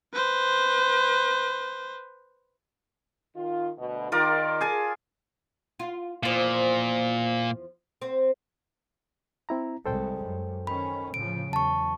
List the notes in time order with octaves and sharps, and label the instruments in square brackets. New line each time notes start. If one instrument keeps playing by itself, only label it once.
[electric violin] B4 C5
[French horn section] D#3 F4
D2 B2
[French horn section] D#3 [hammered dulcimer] F4 A#4 D5
[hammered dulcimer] G#4 G#5 A5
[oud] F4
[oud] E2 F3 [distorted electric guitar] A#2
[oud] C4
[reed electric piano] C4 E4 A#5
[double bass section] C2 G3 G#3 [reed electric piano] A4 C5 G5
[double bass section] F#2
[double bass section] D#3 C#4 [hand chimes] B5
[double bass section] A2 C#3 F3 [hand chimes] D7
[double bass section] E2 F#3 [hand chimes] A5 C#6